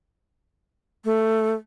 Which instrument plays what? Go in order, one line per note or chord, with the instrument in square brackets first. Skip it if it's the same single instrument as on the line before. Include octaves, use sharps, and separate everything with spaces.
[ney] A3